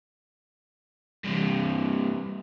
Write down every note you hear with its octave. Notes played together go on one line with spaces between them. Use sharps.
G2 C3